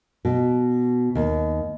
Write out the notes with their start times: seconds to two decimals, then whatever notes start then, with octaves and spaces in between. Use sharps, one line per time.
0.25 B2
1.15 D#2